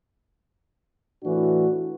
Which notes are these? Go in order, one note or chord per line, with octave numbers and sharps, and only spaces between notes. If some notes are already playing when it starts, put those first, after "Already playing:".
A2 E3 D4 F#4